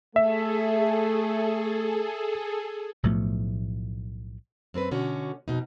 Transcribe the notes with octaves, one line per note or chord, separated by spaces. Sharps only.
A3 G#4 A4 E5
B1 A2 F3 A3
F#2 C4 A#4 B4
B2 D3 C#4 F#4
F2 B2 D#4